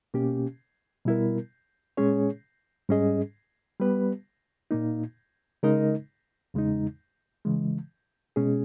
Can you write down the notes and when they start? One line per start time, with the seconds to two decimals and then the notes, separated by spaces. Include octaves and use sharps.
0.14 B2 A#3 C#4 G4
1.05 B2 G3 B3 E4 A#4
1.97 A#2 G#3 C#4 G#4 C#5
2.89 G#2 G3 C#4 G#4 D#5
3.80 G3 B3 G4 B4
4.71 A#2 A#3 D#4
5.63 C#3 G#3 D#4 A#4 D#5
6.54 E2 C#3 G#3 D#4
7.45 C#3 E3 G#3
8.36 B2 G#3 C#4 G#4